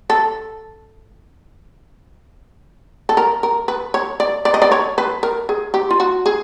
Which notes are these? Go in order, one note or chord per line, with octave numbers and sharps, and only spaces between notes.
A4
A4
A#4
A#4
B4
C#5
D5
D5
D#5
D5
C#5
B4
A#4
G#4
G4
F4
F#4
G#4